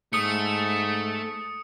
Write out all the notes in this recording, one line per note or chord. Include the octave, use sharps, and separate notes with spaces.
G#2 A3 D#6 C#7